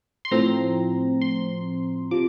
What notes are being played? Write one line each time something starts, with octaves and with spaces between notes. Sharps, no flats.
C6
A2 F3 C4 A#5
C6
C3 F3 D6